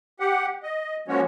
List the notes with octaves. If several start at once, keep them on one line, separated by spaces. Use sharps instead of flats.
G4 F#5
D#5
F3 G#3 A#3 C#4 F#4 C#5